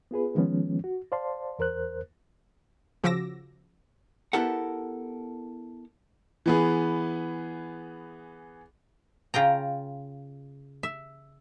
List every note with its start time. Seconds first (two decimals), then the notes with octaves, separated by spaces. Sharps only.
0.11 B3 F4 G#4 B4
0.35 D#3 F3 G#3 B3 C#4
0.84 F#4
1.12 C5 D5 F5 A5 C6
1.59 E2 A#4 C5 F#6
3.04 C#3 F3 F#4 D6 E6 A#6
4.33 B3 E4 G4 A4 A#4 F#5
6.46 E3 B3 G#4
9.34 C#3 F4 G5 A#5
10.83 E5